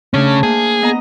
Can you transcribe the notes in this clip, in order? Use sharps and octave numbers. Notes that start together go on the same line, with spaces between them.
C#3 A3 C#4 D4
A#3 G#4 C5
B3 D#5 A#5